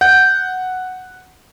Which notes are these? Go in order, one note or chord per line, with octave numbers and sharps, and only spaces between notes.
F#5 G6